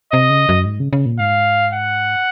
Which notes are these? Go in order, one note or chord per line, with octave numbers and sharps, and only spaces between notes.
C3 D#5
C#3
F#2
G#2
C#3
C#3
A#2
G#2 F5
F#5